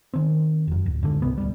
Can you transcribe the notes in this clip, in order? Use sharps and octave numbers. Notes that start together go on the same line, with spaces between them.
D#3 C4
F1 F#2
D1
G#2 D3
C2 C3 B3
D1 G3